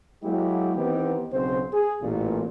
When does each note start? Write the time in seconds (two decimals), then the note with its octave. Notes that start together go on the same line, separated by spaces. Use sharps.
0.23 F#3 G#3 A#3 E4 G4
0.76 D#3 E3 B3 C4 D#4 G4
1.32 B1 C#3 C4 C5
1.73 G#4
2.02 A1 A#2